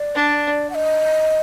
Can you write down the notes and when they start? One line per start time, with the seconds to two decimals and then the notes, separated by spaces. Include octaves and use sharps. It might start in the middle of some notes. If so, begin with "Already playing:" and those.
Already playing: D5
0.15 D4
0.70 F#5
0.75 D#5